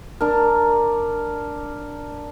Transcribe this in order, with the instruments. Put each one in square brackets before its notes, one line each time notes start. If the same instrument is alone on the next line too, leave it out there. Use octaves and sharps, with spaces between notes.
[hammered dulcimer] D4 A#4